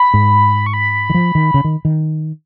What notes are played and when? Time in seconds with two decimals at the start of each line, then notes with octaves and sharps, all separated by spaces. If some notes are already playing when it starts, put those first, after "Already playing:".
Already playing: B5
0.14 G#2
0.66 C#6
0.74 B5
1.10 D#3
1.14 F3
1.35 D#3
1.54 C#3
1.64 D#3
1.85 D#3